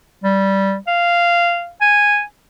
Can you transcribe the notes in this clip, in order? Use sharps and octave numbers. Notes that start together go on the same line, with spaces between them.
G3
F5
G#5